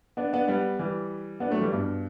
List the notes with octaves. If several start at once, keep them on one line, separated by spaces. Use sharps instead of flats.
B3 D4
B3 D4
G3 B3
E3 G3
B3 D4
F#3 A3
E3 G3
G2 B2